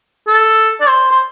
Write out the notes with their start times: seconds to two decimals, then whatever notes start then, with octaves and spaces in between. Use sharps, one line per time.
0.27 A4
0.81 D5
0.88 C5
1.11 C5